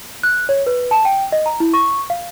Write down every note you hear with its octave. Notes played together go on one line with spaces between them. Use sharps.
F#6
C#5
B4
A5
G5
D#5
A#5
E4
C#6
F5